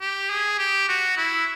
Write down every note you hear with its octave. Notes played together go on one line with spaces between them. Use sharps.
G4
G#4
G4
F#4
E4